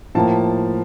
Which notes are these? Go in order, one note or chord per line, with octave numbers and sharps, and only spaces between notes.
A2 F3 A#3 A5